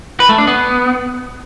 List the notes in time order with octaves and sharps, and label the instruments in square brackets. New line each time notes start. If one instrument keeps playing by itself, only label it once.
[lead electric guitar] B4
A3
D4
B3